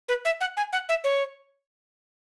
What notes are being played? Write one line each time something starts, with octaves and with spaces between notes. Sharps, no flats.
B4
E5
F#5
G#5
F#5
E5
C#5